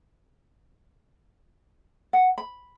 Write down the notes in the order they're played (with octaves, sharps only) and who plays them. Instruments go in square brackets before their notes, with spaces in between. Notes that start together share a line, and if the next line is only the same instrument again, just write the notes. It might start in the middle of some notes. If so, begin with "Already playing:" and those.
[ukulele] F#5
B5